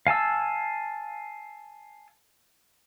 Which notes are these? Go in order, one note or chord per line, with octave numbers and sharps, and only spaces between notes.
F5 G#5 A5 E6